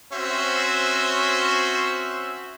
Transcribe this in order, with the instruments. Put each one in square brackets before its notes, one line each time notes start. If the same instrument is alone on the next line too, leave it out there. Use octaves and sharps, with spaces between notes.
[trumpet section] C4 C#4 F#4 C5 E5